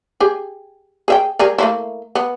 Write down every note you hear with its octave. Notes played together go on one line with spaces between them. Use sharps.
G4 G#4
G#4 E5 G5
G3 G#4 A#4
A3 A#3 E4
B3